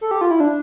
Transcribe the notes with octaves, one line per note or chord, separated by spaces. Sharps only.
A4
G4
F4
E4
D4